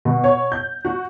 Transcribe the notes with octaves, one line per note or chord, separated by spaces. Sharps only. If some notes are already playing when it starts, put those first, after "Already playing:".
B2
C#5
G6
F#4